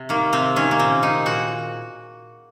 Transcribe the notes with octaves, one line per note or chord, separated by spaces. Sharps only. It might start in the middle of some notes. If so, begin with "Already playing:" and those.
Already playing: C3
D#3 A#3
C3 C4
D#3 C#4
A#3
A#2 C4
G#3 D#4
A#2 F#4